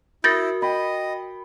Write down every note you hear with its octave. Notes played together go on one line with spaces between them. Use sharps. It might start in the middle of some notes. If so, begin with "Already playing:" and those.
E4 F#4 A#4 G6 A6 A#6
D#5 G5 B5